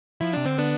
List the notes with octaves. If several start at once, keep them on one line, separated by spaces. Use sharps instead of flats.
F3 E4
C3 D4
D3 C4
B3 D4